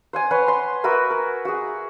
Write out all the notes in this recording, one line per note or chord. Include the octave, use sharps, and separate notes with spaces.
C5 F#5 G#5
B4 C#5 F#5 C6
C6
F#4 A#4 B4 E5
A#4
F#4 G#4